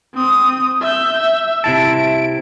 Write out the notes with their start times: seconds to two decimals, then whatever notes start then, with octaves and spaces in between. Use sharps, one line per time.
0.14 C4 D#6
0.81 E5 G6
1.17 E5
1.64 C3 E4 A5 D7